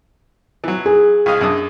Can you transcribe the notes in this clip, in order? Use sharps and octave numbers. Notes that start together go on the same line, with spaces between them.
E3 F#3
G#4
C2 D#5 F5
F#2 D4 D#6